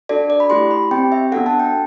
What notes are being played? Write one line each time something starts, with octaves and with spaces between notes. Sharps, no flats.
D4 F#4 A4 D5
D5
B5
A3 E4 G4 C6
B5
C4 G4 G5
E5
B3 D4 F#4 A4 F#5
A5
G5